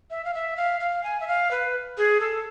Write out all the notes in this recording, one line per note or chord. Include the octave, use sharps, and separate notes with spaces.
E5
F5
E5
F5
F5
G#5
E5
F5
B4
G#4
A4